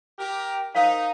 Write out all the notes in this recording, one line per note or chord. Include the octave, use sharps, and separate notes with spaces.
G4 A#4
D#4 A#4 C5 F5